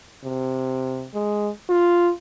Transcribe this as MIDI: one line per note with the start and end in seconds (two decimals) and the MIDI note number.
0.24 1.07 48
1.14 1.50 56
1.70 2.11 65